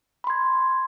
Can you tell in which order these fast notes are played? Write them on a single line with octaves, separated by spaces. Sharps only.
B5 C6 G#6